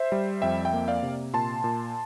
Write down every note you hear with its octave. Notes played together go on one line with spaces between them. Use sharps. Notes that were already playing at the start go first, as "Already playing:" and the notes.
Already playing: C5 E5
G3
F2 E5 G5
E5 G5
A#3
D5 F5
C3
A#2 A5 C6
A#2